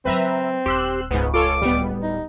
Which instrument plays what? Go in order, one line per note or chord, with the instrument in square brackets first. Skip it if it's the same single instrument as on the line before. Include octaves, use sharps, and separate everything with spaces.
[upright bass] C#3 F#3 [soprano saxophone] C4 [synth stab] B4 E5 A#5
[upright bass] D#1 [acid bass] G4 [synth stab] C6 E6 F#6
[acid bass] C#2 [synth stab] G#2 B3
[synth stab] F4 A4 C#5 [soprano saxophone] D6
[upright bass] D1 [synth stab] G3 B3
[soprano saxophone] D#4